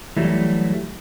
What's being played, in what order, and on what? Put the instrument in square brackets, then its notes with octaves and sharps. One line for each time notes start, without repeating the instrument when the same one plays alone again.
[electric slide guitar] E3 F#3 G3 A3